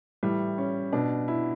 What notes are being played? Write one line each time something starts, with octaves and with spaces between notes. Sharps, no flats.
A2 E3 G3
C#4
B2 D4
E4